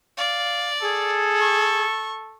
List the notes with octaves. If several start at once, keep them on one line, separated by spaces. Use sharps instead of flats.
D5 F5
G#4 A4
C#6